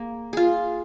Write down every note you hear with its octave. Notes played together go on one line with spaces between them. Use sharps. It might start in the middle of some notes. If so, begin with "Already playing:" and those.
Already playing: A#3 G#4
F4 G#4